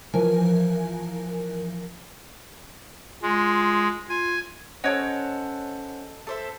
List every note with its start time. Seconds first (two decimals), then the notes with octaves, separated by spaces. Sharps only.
0.14 E3 F3 A#4 G#5
3.22 G#3 F4
4.09 F4 G#5
4.84 C#4 A4 C5 C#5 D#5 F#5
6.27 A4 C5 E5